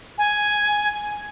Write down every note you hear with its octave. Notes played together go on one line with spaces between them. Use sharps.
G#5